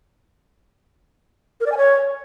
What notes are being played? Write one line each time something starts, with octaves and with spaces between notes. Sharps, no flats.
A#4
D5
G#5
C#5